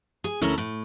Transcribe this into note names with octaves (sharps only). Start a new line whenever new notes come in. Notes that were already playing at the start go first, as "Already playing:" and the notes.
G#4
D2 C#4 E4 A4 A#4
A2